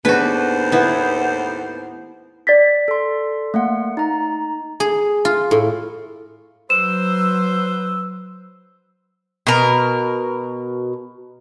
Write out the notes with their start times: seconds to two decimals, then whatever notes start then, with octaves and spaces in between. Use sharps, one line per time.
0.05 D#2 A2 B3 D4 F#4 G#4 B4 C5
0.72 B3 E4 B4
2.47 D5 A6 B6
2.88 A4 C6
3.54 A3 A#3 F#5
3.97 D#4 A#5
4.80 G#4
5.25 F4
5.51 A2
6.70 F#3 B4 C5 E6 E7
9.47 B2 A#4